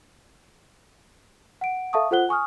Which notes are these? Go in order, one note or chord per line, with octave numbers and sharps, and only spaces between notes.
F#5 D7
A4 E5 F5 A5 C#6 D#6
F4 A4 C5 F#5 F#6 G7
G#5 C#6 D#6 F6